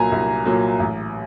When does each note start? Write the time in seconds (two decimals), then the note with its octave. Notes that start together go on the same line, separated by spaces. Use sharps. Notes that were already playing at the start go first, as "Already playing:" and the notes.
Already playing: C2 A#2 F#3 G#5 A#5
0.12 C2
0.45 A#2 F#3
0.79 A1